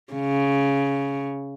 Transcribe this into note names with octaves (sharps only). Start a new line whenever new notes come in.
C#3